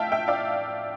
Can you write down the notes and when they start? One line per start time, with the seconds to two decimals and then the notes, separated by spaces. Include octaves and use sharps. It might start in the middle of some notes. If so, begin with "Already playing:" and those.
Already playing: A2 F3 E5 F5 G5 A5
0.12 E5 G5
0.28 D5 F5